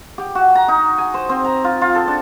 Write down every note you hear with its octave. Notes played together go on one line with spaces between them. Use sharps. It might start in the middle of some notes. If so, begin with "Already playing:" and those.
G4
F#4
A#5
D#4
G#5
C5
C4
A#5
F4
F4
A4
D4